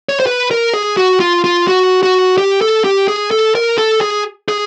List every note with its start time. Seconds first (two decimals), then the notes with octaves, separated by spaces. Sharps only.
0.09 C#5
0.20 C5
0.26 B4
0.51 A#4
0.74 G#4
0.97 F#4
1.20 F4
1.44 F4
1.68 F#4
2.03 F#4
2.38 G4
2.61 A4
2.84 G4
3.08 G#4
3.31 A4
3.55 A#4
3.78 A4
4.01 G#4
4.49 G#4